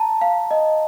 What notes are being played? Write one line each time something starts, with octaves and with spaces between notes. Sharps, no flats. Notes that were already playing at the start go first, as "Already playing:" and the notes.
Already playing: A5 A#5
F5
D#5